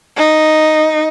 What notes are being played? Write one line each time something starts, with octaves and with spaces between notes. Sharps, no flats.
D#4